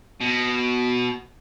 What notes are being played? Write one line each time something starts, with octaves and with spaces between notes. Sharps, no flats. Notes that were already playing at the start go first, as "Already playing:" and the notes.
B2